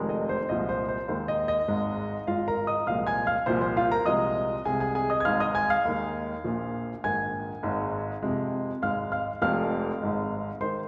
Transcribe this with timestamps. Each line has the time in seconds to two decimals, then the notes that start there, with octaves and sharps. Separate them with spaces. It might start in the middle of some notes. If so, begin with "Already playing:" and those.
Already playing: F1 F2 D#3 G#3
0.09 D#5
0.29 C5
0.49 C2 A#2 F3 G#3 D#5
0.69 C5
0.89 C5
1.08 D#2 D#3 G#3 C5
1.28 D#5
1.48 D#5
1.68 G#1 G#2 G#3
2.27 G#1 G#2 G#3 F4 F5
2.48 A#4 A#5
2.67 D#5 D#6
2.87 C2 A#2 F3 G#3 F5 F6
3.07 G#5 G#6
3.27 F5 F6
3.46 C2 A#2 F3 C5 C6
3.61 C5
3.77 F4 F5
3.92 A#4 A#5
4.06 C2 C3 F3 G#3 D#5 D#6
4.65 C2 C3 G#3 G#4 G#5
4.80 G#4 G#5
4.95 G#4 G#5
5.10 D#5 D#6
5.20 G#6
5.25 G#1 G#2 G#3 F5 F6
5.40 D#5 D#6
5.55 G#5 G#6
5.70 F5 F6
5.85 D#2 D#3 G#3
6.44 A#1 A#2 F3
7.04 A#1 G#2 D#3 G#5 G#6
7.63 G#1 G#2 G#3
8.22 F2 C3 G#3
8.82 G#1 G#2 G#3 F5 F6
9.12 F5 F6
9.42 F1 F2 F3 G#3 F5 F6
10.02 G#1 G#2 G#3
10.61 D#3 G#3 C5 C6